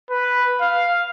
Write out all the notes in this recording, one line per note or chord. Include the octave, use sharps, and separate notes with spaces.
B4
F5